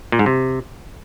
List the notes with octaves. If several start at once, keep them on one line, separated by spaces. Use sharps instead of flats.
A#2
G#2
C3